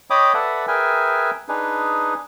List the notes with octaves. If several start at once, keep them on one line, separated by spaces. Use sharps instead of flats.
C#5 D#5 G5 B5 D6 D#6
A4 B4 D5 E5 F#5
G#4 A#4 B4 E5 G5 G#5
D4 D#4 G#4 B4